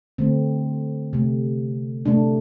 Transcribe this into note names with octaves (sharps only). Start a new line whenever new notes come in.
D3 A3 C4
C3 A3
C3 A3 D4